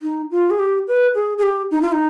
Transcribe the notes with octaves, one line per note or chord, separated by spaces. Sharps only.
D#4
F4
G#4
G4
B4
G#4
G#4
G4
D#4
F4
D#4